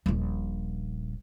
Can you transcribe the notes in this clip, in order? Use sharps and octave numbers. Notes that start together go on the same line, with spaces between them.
D#1 A#1